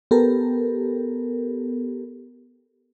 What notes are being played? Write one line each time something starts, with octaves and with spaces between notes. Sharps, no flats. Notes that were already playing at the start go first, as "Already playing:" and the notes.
B3 G4 A4 A#4